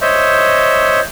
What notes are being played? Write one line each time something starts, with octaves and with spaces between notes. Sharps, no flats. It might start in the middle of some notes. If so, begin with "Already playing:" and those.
C5 C#5 D#5 E5